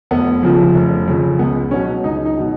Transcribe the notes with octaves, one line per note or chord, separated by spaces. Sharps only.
F1 B3
F2 C#3 F3
F1
F2 C#3 F3
C#2 B3
B2 F#3 C#4
C#2 D#4
D#4
B2 F#3